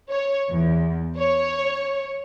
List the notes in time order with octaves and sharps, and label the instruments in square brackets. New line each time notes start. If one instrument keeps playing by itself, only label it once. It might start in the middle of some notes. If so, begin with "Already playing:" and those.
[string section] C#5
E2
C#5